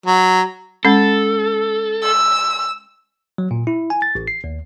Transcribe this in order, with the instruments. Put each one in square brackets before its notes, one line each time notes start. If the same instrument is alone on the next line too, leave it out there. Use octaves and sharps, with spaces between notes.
[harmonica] F#3
[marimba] G#3 C#4 [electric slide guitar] A4
[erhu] E6
[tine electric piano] F#3
A#2
E4
G#5
A6
A1
C7
D#2